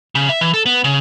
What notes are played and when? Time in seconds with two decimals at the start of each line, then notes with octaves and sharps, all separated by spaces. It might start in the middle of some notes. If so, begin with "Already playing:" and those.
0.15 C#3
0.29 E5
0.41 E3
0.54 A4
0.66 B3
0.84 C#3